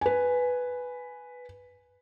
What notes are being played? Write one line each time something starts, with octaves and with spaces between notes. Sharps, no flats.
B4 G#5